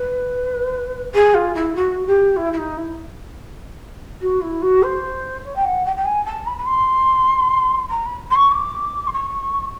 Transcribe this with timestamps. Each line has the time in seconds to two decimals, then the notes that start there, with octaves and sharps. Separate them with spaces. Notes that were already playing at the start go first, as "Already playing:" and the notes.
Already playing: B4
1.14 G#4
1.34 F4
1.54 E4
1.75 F#4
2.06 G4
2.36 E4
2.52 E4
2.57 D#4
2.77 E4
4.21 F#4
4.41 E4
4.62 F#4
4.82 C5
5.44 C#5
5.55 G5
5.64 F#5
5.85 G5
5.96 G5
6.05 G#5
6.25 A5
6.46 B5
6.57 B5
6.66 C6
7.89 A#5
8.05 B5
8.30 C6
8.35 C#6
8.51 D6
9.07 C6
9.12 C#6